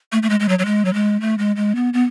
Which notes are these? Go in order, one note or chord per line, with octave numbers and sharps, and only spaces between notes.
A3
A3
G#3
G#3
F#3
F#3
G#3
F#3
G#3
A3
G#3
G#3
B3
B3